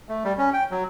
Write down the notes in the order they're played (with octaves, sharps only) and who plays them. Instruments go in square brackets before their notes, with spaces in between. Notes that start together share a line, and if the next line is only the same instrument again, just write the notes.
[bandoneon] A3
G3
C#4
G5
F#3